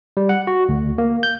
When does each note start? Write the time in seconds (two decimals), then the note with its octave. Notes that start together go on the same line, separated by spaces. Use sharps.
0.17 G3
0.29 F#5
0.47 F#4
0.69 D2
0.98 A#3
1.23 G6